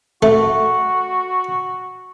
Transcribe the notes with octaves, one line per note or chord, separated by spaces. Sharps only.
A3 F#4